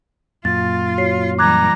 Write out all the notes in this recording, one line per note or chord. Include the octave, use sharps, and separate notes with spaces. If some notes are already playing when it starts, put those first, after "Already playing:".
F#2 A#2 F4 A6
F#4 C#5 C7
E3 G3 A#5 D6 F#6 G#6